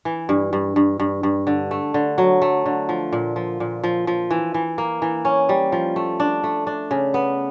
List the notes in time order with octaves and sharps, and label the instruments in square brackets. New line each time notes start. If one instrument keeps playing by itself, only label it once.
[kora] E3
G2
G2
G2
G2
G2
D3
A3
D3
F#3
A3
D3
F3
A#2
F3
A#2
F3
F3
E3
E3
A#3
E3
C#4
G3
F3
A3
D4
A3
D4
C#3
B3